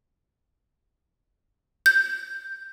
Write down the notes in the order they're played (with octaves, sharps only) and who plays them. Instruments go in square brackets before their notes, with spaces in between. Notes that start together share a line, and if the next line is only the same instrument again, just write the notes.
[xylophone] G6